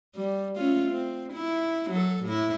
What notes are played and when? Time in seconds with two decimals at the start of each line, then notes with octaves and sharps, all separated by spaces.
0.15 G3
0.56 A3 C#4 F4
0.91 C4
1.33 E4
1.90 F#3 A4
2.24 A2 E4